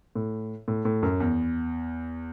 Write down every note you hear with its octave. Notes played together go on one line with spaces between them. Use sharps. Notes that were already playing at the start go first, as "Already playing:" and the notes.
A2
A2
A2
F#2
E2